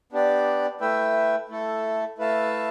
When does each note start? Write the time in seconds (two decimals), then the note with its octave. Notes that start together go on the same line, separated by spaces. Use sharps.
0.12 B3 D4 G4 D5
0.80 A3 E4 B4 E5 G5
1.49 A3 E4 A4
2.18 A3 E4 B4 F5 A5